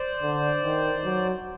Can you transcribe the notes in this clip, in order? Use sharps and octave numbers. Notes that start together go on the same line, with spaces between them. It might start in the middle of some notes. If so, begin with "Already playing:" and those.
Already playing: C5 D5
D3
D#3
F#3